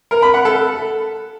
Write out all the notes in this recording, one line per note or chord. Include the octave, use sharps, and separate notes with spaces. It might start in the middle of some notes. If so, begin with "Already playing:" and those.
A#4
B5
F#5
A4